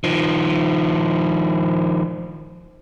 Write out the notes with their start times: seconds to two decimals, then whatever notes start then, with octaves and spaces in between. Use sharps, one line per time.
0.04 D#3 F3